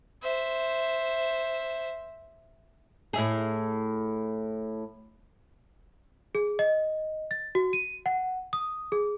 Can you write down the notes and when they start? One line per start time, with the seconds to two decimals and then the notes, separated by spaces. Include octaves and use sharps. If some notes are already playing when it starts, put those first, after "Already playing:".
0.22 C5 E5
3.13 A2 E4 G#4
6.35 G#4
6.59 D#5
7.31 A6
7.55 F#4
7.73 D#7
8.06 F#5
8.53 D#6
8.92 G#4